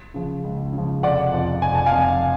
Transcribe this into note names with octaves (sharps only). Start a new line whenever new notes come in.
C#3 F3
C#2
C#3 F3
F1 D5 F#5
F2 F3
F1 G#5
A5
F5 G#5
F2 F3